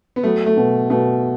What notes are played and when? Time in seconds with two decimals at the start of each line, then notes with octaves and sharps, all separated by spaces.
0.16 B3
0.23 F#3 A3
0.46 A3
0.57 B2
0.90 B2 A3